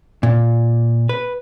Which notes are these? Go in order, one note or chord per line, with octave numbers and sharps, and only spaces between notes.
A#2
B4